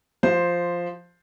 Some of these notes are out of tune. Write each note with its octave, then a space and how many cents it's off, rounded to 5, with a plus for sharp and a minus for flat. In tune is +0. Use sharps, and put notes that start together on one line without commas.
F3 +0 C5 +0